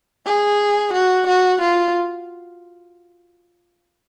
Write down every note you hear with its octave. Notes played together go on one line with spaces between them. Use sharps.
G#4
F#4
F#4
F4